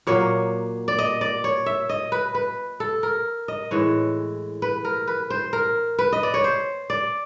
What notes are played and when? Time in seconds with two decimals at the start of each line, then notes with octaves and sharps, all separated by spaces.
0.07 A#2 F#3 A#3 C#5
0.88 D5
0.99 D#5
1.21 D5
1.44 C#5
1.66 E5
1.89 D#5
2.12 B4
2.35 B4
2.80 A4
3.03 A#4
3.48 D#5
3.71 A2 E3 G#3 C#5
4.62 B4
4.85 A#4
5.07 B4
5.30 C5
5.53 A#4
5.99 B4
6.12 D#5
6.23 D5
6.34 C#5
6.44 C5
6.90 D5